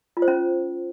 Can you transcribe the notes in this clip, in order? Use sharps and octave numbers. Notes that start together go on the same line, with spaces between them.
F4
C5
C#4